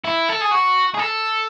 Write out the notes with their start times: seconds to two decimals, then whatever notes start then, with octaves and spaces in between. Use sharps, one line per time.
0.05 E4
0.29 A4
0.42 G#4
0.52 F#4
0.94 G#4
0.99 A4